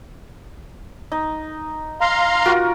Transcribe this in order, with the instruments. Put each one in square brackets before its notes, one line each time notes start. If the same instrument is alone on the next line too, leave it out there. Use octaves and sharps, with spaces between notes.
[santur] D#4
[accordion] F5 A#5 C6
[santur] F4 F#4 A#4